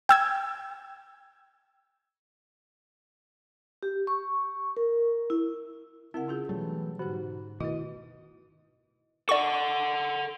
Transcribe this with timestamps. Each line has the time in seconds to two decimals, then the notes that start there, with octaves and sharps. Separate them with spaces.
0.09 G5 E6 G#6
3.83 G4
4.07 C#6
4.77 A#4
5.30 E4
6.14 C#3 C4 E4 A#4 F#5
6.28 C#4 F4 G#4
6.49 B2 E3 F#3 G3 A3
6.99 G#2 D3 F#4 G4
7.60 B2 D#3 A3 E4 F#4 B4 D#5
9.29 A4 D5 F#5 C#6